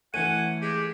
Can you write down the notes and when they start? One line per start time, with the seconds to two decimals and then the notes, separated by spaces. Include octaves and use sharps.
0.14 E3 A3 C#4 F#5 D#7
0.62 G#3 G4